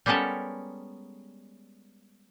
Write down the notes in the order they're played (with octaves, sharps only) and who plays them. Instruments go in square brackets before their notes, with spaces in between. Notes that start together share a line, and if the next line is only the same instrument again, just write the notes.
[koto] G3 G#3 B3 C#4 A4 A#4